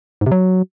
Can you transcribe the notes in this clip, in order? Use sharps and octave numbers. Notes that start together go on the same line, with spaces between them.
G#2
C3
F#3